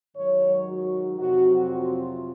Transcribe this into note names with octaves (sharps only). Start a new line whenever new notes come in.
G#2 D#3 F#3 C#5
F#4
F2 C3 F#3 C4 F#4
F4